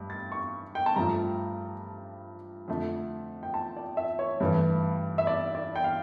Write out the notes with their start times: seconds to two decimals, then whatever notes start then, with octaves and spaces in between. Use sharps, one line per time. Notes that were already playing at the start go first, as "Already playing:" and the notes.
Already playing: G2 A3
0.10 A6
0.32 C#6
0.75 G5
0.86 A5
0.96 G2 F3 A3 A#5
2.68 F2 D3 A3
3.43 G5
3.54 A5
3.76 D5
3.97 E5
4.19 C#5
4.40 G2 E3 A3
5.18 E5
5.27 D5
5.55 D5
5.76 G5
5.84 F5